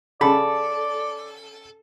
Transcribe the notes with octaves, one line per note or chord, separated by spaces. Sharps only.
C#3 A4 D5 B5